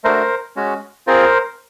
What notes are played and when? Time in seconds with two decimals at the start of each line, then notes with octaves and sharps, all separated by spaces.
0.04 A3 D4 F#4 A#4 C5
0.56 G#3 C#4 F#4
1.07 C4 F4 G#4 A#4 C5